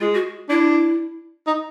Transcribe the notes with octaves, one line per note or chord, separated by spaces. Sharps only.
G#3 F4
F#4
D4 E4
D#4